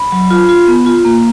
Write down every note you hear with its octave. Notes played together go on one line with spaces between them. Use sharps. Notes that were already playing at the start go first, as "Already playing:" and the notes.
Already playing: B5
F#3
F4
F4
B3
F4
A#3